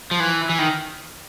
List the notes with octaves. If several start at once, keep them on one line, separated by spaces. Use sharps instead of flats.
F3
E3
E3
D#3